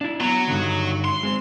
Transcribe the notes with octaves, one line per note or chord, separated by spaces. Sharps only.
D4 E4
F#3 B3 A#5
G2 D3 D#3
C6
G#3 C4